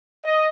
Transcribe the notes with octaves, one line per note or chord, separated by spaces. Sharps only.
D#5